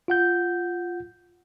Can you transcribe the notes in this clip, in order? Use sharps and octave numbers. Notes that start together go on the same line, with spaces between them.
F4 F#5 G6